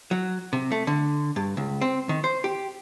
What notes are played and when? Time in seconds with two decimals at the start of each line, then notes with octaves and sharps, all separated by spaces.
0.11 F#3
0.53 C3
0.72 A3
0.87 D3
1.36 G2
1.57 C#2
1.81 C4
2.09 D#3
2.24 C5
2.44 G4